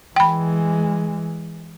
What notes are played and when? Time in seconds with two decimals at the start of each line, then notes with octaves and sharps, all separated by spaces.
0.16 E3 G#3 G5 B5